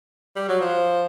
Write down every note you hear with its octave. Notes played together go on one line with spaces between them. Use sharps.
G3
F#3
F3